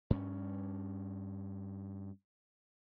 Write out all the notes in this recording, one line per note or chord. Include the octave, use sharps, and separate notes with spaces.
G2 C#4